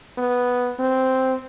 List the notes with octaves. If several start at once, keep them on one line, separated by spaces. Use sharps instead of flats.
B3
C4